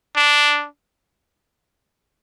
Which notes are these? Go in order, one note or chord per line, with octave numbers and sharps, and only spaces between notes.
D4